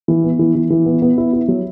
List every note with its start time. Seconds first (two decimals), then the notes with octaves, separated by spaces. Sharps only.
0.08 E3
0.24 B3
0.39 E3
0.55 E3
0.70 E3
0.86 B3
1.02 B3
1.18 E4
1.33 E4
1.48 F#3